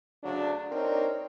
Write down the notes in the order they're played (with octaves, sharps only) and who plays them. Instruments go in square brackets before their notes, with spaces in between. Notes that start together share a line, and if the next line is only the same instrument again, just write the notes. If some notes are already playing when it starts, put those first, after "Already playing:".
[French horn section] D2 C#3 F#3 D4
C4 D4 D#4 A#4 C#5 D5